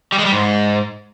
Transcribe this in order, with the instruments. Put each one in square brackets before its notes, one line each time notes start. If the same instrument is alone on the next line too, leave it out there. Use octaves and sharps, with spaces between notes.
[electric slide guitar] G3
G#3
G3
G#2